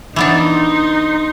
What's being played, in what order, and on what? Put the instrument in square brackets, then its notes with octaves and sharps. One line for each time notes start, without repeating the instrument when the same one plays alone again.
[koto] E3 B3 D4 [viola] D#4 C6